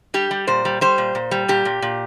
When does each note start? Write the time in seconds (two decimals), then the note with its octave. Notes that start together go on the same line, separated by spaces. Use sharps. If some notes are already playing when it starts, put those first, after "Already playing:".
0.14 G3 G4
0.31 G3
0.47 A#2 C5
0.65 G3
0.81 G3 C5
0.98 A#2
1.15 A#2
1.31 G3
1.48 A#2 G4
1.65 A#2
1.82 A#2